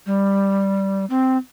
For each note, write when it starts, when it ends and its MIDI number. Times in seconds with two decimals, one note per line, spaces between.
0.06 1.05 55
1.10 1.37 60